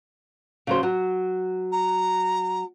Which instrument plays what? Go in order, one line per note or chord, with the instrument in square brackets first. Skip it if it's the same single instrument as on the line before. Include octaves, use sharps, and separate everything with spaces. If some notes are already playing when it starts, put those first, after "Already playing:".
[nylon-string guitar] C#3 F#3 C5
F#3
[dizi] A#5